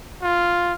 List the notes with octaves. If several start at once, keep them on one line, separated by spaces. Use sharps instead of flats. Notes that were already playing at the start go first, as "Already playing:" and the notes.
F4